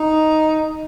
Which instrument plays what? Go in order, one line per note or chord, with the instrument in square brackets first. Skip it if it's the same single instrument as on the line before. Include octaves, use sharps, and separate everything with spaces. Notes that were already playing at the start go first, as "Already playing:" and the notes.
Already playing: [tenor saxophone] D#4